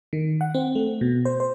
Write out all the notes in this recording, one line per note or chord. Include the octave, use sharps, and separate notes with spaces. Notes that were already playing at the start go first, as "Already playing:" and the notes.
D#3
F#5
C4
A3
B2
C5
C5